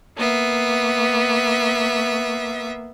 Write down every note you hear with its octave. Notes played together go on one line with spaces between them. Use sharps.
A#3 B3 E5